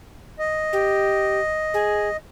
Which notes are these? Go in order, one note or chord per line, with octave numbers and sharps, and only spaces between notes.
D#5
G4
G#4